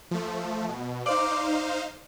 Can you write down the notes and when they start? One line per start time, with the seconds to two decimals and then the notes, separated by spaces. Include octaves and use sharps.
0.11 F3 A3
0.69 B2
1.06 D#4 C5 D5 F5